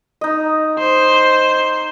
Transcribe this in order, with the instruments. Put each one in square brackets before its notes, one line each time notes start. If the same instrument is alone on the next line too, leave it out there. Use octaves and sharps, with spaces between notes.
[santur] D#4 D#5
[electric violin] C5